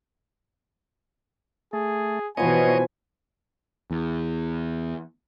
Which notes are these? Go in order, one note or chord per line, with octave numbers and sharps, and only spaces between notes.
A3 G#4
B2 E3 F3 B3 B4 C#5 D#5 G#5
E2